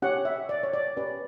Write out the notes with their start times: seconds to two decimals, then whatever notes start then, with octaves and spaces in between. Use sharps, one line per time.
0.02 C#4 G4 C#5 F#5
0.25 E5
0.49 D5
0.63 C#5
0.73 D5
0.97 C#4 G4 B4 D5